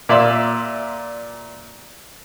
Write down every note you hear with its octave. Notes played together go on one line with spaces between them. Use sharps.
A#2 D5 E5 C6 E6